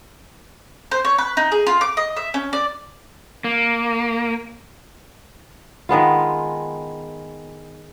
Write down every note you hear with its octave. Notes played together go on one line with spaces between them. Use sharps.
C5
C#5
B4
D#4
G#4
F4
D6
D#5
E5
C#4
D5
A#3
D#3 G#3 B3 F4